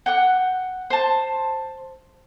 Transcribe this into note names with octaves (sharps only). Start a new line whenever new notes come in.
F#5 G5 D6 F#6
C5 A5